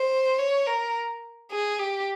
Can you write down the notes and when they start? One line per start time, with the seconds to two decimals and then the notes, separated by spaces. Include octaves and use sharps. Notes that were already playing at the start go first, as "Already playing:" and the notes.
Already playing: C5
0.38 C#5
0.67 A#4
1.51 G#4
1.79 G4